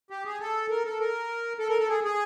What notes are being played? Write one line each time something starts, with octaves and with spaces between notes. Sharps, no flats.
G4
G#4
A4
A#4
A4
A#4
A4
A#4
A4
G#4
G#4